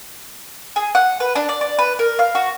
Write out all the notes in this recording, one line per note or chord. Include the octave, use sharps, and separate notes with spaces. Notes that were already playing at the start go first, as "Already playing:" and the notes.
G#4
F#5
B4
D4
D5
D5
B4
A#4
F5
F#4